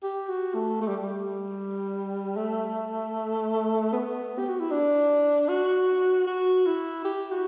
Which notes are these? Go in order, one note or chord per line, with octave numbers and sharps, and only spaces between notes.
G4
F#4
A3
A3
G3
G3
A3
B3
G4
F#4
E4
D4
F#4
F#4
E4
G4
F#4